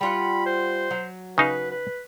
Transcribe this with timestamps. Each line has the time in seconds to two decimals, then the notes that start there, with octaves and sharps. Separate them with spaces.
0.01 G3 F4 F#5 B5
0.46 C5
0.91 F#3
1.38 C#3 D#4 B4 F5
1.71 B4